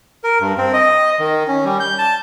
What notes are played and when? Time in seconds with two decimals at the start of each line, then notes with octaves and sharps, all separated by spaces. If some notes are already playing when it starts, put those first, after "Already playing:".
0.24 A#4
0.40 G2
0.58 C4
0.73 D#5
1.20 D#3
1.48 C#4
1.65 G3
1.80 G6
1.99 A5